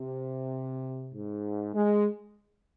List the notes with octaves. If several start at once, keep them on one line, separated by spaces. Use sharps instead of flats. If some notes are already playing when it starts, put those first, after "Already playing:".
Already playing: C3
G#2
G#3